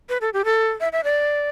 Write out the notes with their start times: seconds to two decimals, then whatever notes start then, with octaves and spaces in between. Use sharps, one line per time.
0.09 B4
0.21 A4
0.33 G4
0.45 A4
0.80 E5
0.92 E5
1.04 D5